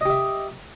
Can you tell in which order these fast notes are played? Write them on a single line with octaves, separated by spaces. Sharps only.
D#5 G4 E5